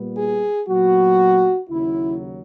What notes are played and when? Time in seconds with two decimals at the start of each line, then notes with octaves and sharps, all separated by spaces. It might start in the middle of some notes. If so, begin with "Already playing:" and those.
Already playing: A#2 G3 B3
0.16 G#4
0.68 A#2 F#3 B3 F#4
1.70 D#2 C#3 F#3 E4